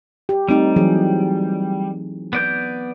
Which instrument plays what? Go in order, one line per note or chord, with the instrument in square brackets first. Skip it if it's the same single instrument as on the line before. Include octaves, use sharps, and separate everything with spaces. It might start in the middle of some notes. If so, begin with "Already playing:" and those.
[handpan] G4
[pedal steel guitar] G3 [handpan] A3 C4 D#4
[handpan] E3 F#3 G#4
[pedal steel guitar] B3 D5 G6